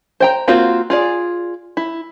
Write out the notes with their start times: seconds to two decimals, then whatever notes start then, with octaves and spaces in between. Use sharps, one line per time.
0.20 C5 G5 A#5
0.48 A#3 C4 F4 F#4 C5
0.90 F4 G#4 D5
1.77 E4